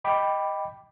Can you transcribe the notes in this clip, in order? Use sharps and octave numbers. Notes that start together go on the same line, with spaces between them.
D#5 G5 B5 D6